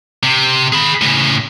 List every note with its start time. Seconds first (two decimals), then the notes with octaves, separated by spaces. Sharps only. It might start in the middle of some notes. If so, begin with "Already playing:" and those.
0.23 C3
0.73 G#4 B5
1.01 A2 C#3